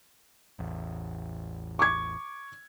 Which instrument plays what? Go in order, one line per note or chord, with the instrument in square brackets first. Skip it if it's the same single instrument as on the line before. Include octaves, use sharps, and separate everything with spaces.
[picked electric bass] A1 E2
[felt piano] C#6 D6 G#6